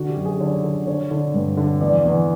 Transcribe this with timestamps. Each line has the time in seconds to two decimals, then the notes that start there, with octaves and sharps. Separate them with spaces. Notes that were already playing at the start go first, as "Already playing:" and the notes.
Already playing: D3 F#4
0.09 G4
0.16 F#2
0.25 G#4
0.40 D3 C#5
0.64 D3
0.87 D3 C#5
1.11 D3
1.34 G2
1.57 D3
1.81 E2 D5
2.05 E2